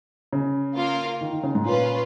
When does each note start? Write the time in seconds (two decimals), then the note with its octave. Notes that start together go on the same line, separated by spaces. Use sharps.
0.33 C#3
0.76 A#3 F4 A#4 F5
1.21 D#3
1.32 D#3
1.43 C#3
1.55 G#2
1.65 A#2 C#4 F4 B4